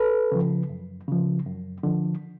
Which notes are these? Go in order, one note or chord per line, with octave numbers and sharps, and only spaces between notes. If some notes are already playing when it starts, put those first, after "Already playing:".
Already playing: A4 B4
C#3 F3
F#2
C#3 F3
F#2
D3 F3